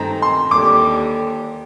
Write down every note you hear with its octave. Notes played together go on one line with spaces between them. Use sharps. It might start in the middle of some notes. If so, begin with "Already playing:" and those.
Already playing: G2 D#3 A3 C4 D#4 A#5
C6
D#2 D3 G3 D6